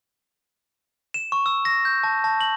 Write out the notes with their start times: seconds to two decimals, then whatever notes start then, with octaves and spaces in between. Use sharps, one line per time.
1.14 E7
1.32 C#6
1.46 E6
1.65 A#6
1.85 G6
2.04 A5
2.24 A5
2.41 F#7